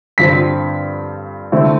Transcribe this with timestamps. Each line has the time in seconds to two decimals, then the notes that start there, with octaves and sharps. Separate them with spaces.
0.18 G2 D3 F3 C4 B6
1.52 D3 A3 C4 E4